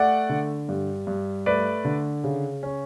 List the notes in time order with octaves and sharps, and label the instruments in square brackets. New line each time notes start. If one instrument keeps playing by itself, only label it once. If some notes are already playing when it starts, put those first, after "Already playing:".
Already playing: [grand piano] A3 D5 F#5
D3
G2
G2
A3 B4 D5
D3
C#3
C#4